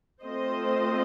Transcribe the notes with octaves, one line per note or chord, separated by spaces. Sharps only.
A3 C4 F4 C5 D#5